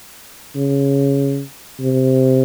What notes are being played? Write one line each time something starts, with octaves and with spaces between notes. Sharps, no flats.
C#3
C3